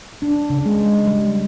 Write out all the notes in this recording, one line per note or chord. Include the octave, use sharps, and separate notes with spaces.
D4
C#3
G#3
G3